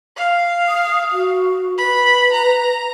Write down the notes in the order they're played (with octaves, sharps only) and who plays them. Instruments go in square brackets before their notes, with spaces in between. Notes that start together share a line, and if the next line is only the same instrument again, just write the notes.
[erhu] F5
[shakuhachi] D#6
F#4
[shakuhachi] B4 [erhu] B5
[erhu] A#5